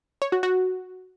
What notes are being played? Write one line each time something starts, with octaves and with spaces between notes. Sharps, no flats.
C#5
F#4
F#4